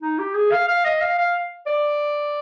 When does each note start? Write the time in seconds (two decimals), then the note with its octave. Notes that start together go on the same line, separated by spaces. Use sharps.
0.02 D#4
0.18 G4
0.35 G#4
0.51 F5
0.67 F5
0.85 D#5
1.00 F5
1.18 F5
1.66 D5